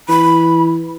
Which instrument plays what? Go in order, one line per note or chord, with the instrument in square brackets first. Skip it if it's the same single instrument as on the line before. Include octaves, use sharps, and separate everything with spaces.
[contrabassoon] E3 [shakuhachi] B5